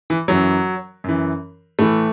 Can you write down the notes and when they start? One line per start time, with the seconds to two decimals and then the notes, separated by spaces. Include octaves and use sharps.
0.10 E3
0.28 F#2 E3 F#3
1.04 F#2 E3
1.79 A2 E3 A3